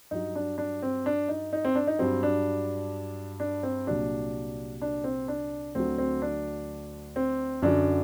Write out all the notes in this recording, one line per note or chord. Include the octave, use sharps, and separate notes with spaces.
G2 F#3 D#4
D4
D4
C4
D4
D#4
D#4
C4
D4
D#4
G2 F#3 C4
D4
D4
C4
C2 A#2 F#3 D4
D4
C4
D4
D2 D3 F#3 C4
C4
D4
C4
F#2 D3 F#3 D4